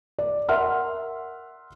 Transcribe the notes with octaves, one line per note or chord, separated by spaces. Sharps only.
D5
A#4 E5 F#5 C6 F6